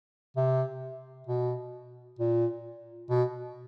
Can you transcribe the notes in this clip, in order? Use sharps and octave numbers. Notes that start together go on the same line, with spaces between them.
C3
B2
A#2
B2